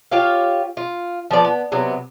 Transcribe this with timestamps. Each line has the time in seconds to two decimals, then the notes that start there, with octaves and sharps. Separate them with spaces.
0.12 F4 G4 C#5 F5
0.77 F4
1.31 F3 B3 D5
1.44 B3
1.72 C3 F#3 B3